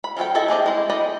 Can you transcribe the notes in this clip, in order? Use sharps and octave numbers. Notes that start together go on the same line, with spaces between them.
B5
F3 F4 G#4 A4 G5
E4 A4 D#5 E5 A5
C4 G4 G#4 D#5
G#3 E4
G4 A4 D#5 B5